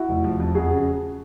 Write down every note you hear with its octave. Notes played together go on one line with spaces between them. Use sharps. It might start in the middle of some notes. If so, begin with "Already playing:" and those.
Already playing: E4 F#4
F1
F3
F2
F2 F#4 G#4
C#3